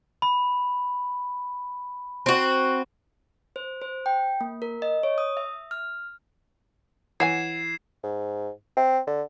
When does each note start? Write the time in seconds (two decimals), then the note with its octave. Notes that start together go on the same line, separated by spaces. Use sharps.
0.22 B5
2.26 C4 F#4
3.56 C5
3.81 C5
4.06 G5
4.41 A#3
4.62 A#4
4.82 D#5
5.03 C#5
5.18 D#6
5.37 E5
5.71 F6
7.20 E3 C#5 F#5 G#5 G#6 C7 E7
8.03 G#2
8.77 C4
9.07 D3